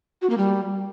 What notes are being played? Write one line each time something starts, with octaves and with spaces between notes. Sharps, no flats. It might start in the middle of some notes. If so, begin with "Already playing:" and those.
F#4
A#3
G3